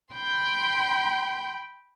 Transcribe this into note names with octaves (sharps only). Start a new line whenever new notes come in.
G5 B5 C6 G6